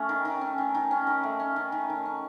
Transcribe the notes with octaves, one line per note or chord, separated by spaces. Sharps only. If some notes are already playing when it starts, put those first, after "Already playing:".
Already playing: A3 C#4
D#3
D#3
C#4
D#3
D#3
C#4
D#3
A3
C#4
D#3
D#3
D#3
C#4